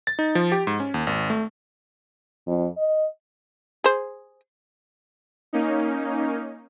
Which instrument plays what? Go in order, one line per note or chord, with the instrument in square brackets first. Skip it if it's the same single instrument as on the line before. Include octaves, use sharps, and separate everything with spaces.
[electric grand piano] A6
D#4
F3
G4
G#2
C#4
D#2
G#1
A3
[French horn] F2
D#5
[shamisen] G#4 C5
[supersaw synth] A#3 C#4 D#4